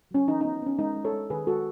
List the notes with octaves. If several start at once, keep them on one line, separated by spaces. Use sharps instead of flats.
F#3 C#4
E3 D#4
D#4
B3
B3 C#4
G#3 D#4
G#3
A4 C#5
G#3
D#3 G#4 B4
G#3 F#4 A4